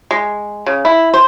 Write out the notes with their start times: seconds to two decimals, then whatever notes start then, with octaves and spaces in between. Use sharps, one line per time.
0.11 G#3
0.66 C#3
0.85 E4
1.14 C5